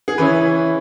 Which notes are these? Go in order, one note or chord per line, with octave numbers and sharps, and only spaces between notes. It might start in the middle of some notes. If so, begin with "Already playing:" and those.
G#4
C#3 E3 C#4 E4 B4